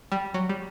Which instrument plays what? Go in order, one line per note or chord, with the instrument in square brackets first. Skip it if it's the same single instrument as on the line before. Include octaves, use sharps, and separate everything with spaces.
[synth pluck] G3
F#3
G3